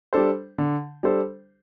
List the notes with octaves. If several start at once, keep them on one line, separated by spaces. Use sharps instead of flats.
G3 D4 A4 C5
D3
G3 D4 A4 C5